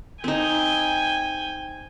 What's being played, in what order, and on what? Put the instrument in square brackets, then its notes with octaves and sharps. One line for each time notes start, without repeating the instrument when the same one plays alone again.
[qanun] C4 D#4 [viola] G5 G#5